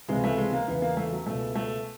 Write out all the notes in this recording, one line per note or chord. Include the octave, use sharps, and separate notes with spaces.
C#2 C3 E3 G#3
A3
G#3
A#3
E2 C#3 E3 B3
A#3
A3
F#3
C#2 B2 A3
A3